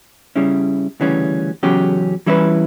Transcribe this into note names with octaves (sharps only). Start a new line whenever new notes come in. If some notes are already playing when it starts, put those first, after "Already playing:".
C#3 G3 C#4 E4
D2 C#3 E3 G3 C#4
E2 C#3 F#3 C#4 G4
E3 G3 C#4 E4 B4